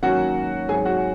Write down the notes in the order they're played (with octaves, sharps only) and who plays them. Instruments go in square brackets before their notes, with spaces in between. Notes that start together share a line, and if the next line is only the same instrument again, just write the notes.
[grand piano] G#2 D#3 F#3 A#3 C#4 F#4 F#5
G#2 F#3 C4 G#4 G#5
F#4 F#5